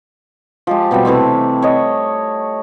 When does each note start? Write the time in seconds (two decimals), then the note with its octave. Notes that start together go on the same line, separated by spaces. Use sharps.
0.67 F3 G#3 G4
0.91 B2 G3 A#3 C4
1.05 C3 E3 A3 C4
1.62 C#5 D#5